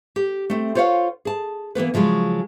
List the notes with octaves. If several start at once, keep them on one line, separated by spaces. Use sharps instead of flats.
G4
A3 C4
F4 C5 C#5 D#5 F5 F#5
G#4 A5
E3 A#3 B3 B4
C#3 F3 F#3 G#3